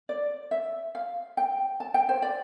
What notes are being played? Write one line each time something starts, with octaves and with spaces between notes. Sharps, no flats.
D5
E5
F5
G5
A5
G5
C5
D5